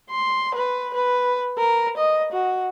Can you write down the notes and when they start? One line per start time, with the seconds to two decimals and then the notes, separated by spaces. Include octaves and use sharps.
0.11 C6
0.55 B4
0.94 B4
1.58 A#4
1.98 D#5
2.33 F#4